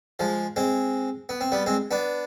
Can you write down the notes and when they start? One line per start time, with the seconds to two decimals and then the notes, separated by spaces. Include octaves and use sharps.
0.19 F3 G#3
0.56 G#3 C4
1.29 B3
1.41 C4
1.52 G3 B3
1.66 G#3 C4
1.91 B3 D4